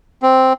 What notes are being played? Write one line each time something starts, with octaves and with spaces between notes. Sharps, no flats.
C4